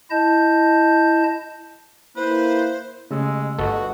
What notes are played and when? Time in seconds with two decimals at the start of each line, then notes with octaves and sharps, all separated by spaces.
0.11 E4 D#5 A5 G6
2.16 A#3 E4 B4 C5
3.11 C#3 G#3 A3 G4 E6
3.59 G1 F#4 A4 B4 D#5